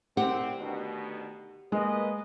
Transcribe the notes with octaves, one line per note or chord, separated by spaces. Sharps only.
C2 C4 G4 F#5
D2 B2 D#3
G#3 A#3 B4 D#5